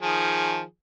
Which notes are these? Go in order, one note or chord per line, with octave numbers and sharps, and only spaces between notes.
D#3 F3 G#4